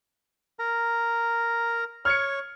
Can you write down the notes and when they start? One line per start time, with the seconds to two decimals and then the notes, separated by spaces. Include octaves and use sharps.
0.59 A#4 A#5
2.05 C#5 C#6 F6 G#6 C#7